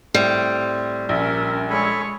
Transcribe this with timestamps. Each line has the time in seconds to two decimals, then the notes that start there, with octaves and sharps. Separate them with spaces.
0.14 A2 G3 C4
1.09 A#1 C#4 A#4 E5
1.70 G#3 A4 C#5 G#5 B5